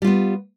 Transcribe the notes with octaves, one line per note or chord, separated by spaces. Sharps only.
G3 B3 F4